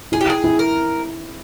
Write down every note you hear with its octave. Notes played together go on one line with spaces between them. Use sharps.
E4 G#4
G4
G#4
E4
A#4